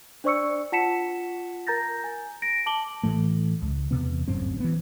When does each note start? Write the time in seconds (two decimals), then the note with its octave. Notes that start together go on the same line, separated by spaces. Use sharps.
0.24 D4 C5 D5 C#6 E6 C#7
0.72 F4 F#5 A5 B6 C#7 E7
1.67 A#4 A#5 G6 A6 A#6
2.04 G#5
2.42 A#6 D7
2.66 A5 D6 F#7 G7
3.03 A2 E3 A3
3.62 C#2
3.91 E2 G#2 C3 B3
4.28 D1 G1 F#2 C4
4.60 E3 B3